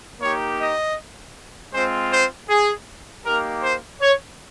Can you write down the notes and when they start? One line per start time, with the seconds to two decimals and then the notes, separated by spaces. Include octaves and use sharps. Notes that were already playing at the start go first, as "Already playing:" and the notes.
0.20 A#3 D#4 G4 C#5
0.59 D#5
1.72 G#3 C4 F4 C5
2.11 C5
2.48 G#4
3.24 A#3 D#4 G4 A#4
3.62 C5
4.00 C#5